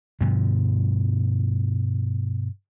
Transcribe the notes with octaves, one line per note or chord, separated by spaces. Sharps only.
G2 B2 D3 F3